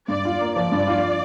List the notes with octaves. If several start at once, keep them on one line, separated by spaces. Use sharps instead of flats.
G2 D5
F4
A#3
F3 D5
G2
F4